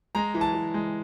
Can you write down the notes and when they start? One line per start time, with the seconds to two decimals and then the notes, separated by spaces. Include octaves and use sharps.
0.15 G#3 A#5
0.34 E3
0.41 A5
0.54 E3
0.74 G#3